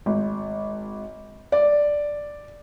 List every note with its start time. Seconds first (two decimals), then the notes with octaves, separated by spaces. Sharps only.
0.06 G#1
1.52 D5